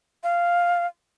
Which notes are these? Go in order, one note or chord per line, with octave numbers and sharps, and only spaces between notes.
F5